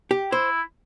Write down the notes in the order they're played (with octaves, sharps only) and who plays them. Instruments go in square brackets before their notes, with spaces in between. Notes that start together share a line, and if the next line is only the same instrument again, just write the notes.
[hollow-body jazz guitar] G4
[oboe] E4 [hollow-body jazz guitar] C5